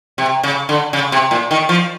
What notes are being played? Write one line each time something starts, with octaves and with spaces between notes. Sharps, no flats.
C3
C#3
D3
C#3
C3
A#2
D#3
F3